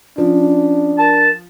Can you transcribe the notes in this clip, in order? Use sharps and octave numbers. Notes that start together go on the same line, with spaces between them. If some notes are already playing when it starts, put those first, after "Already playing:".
F3 C#4 D4
A#4 A5